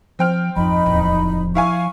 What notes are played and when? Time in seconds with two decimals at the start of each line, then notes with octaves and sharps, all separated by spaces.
0.19 F3 C4 G5 F6
0.56 G#1 F2 F3 D#4 D#5 B5
0.86 D1 E2
1.55 E4 F5 G#5 C#6